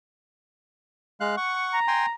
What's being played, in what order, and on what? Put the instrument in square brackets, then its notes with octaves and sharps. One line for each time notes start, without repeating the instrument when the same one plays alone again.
[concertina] G#3 F5 F#6
F#5 C#6
[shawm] A#5
[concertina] G5 G#5 C6